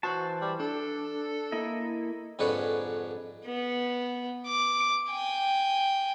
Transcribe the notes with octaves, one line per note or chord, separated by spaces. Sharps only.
E3 F#4 C5 A5
G3
D4 A4
A#3 E4 D#5
F2 G#2 D3 B4 C#5
B3
D6
G5 G#5